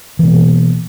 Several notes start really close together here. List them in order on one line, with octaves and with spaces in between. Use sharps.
E3 B2 A#3